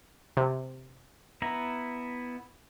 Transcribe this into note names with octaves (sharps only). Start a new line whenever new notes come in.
C3
B3 E4 A#5